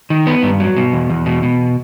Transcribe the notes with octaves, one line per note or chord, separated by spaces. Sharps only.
D#3
B3
G2
F#3
B2
E2
E2
B2
B2